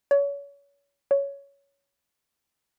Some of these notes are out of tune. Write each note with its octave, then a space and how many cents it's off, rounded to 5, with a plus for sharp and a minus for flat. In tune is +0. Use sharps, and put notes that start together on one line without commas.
C#5 +30
C#5 +10